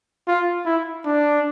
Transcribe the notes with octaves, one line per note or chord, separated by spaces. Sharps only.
F4
E4
D4